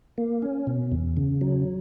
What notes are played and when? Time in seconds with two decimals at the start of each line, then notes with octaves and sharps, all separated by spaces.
0.18 A#3
0.42 C#4
0.67 B2
0.92 E2
1.17 C#3
1.41 F#3